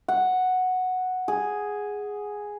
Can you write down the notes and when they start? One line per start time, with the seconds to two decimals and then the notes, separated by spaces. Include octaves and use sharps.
0.08 F#5
1.28 G#4